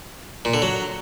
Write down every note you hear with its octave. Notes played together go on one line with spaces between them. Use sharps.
A#2
D3
F#3